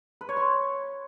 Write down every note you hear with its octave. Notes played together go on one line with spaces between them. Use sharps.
B4
C#5
C6